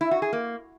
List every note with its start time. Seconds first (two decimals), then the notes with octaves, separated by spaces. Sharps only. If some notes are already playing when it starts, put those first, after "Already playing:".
0.01 E4
0.11 F#4
0.22 G#4
0.33 A#3